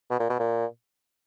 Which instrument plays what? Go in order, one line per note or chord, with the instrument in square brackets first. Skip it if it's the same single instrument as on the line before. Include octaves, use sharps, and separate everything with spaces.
[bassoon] B2
A#2
B2
A#2